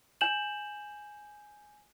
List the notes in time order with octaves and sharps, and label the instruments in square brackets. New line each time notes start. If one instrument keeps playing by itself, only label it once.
[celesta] G#5 G6 E7 F#7